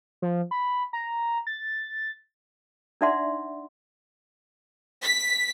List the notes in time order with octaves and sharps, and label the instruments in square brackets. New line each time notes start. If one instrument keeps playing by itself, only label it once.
[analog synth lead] F3
B5
A#5
A6
[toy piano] D4 D#4 D5 E5 F#5 C6
[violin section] B6